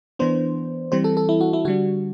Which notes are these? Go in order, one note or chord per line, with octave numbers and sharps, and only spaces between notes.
E3 B3 D4 C5
E3 G3 C4 C5
A4
A4
E4
F#4
E4
D3 G3 D4 F#4